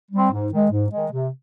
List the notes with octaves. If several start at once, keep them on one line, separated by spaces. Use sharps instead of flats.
G3 C4
G#2
D#3 G#3
G#2
D#3 G#3
C3